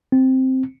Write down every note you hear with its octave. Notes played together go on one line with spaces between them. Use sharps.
C4